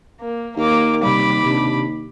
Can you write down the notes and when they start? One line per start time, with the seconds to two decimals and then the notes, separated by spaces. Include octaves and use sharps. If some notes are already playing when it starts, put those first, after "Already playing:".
0.20 A#3
0.57 D#2 A#3 D6
1.03 C3 G3 B5 D6
1.47 C3 D4